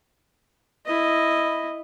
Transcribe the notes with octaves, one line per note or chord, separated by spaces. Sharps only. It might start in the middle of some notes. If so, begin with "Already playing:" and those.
E4 D#5